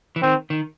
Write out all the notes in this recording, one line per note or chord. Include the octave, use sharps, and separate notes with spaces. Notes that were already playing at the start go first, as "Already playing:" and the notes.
E3
D#3 C4
D#3